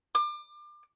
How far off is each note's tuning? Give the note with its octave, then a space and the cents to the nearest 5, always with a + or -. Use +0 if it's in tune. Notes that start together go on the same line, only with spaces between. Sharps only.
D6 +30